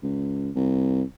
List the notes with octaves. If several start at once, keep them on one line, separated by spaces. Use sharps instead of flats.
C#2
C2